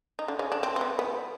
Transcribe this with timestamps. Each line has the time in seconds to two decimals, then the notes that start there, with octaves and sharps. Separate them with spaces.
0.19 D#4
0.28 D3 D4
0.39 C#3 C#4
0.52 D3 D4
0.63 C4
0.76 C4
0.81 B3
0.99 B3